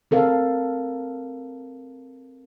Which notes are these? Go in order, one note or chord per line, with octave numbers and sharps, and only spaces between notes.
C4 A4 A#4 F5